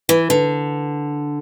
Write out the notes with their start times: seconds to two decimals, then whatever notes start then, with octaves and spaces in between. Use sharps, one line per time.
0.09 E3
0.30 D3